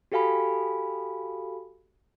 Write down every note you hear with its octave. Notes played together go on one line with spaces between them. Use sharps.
F#4 G4 A4 F5 G#5 B5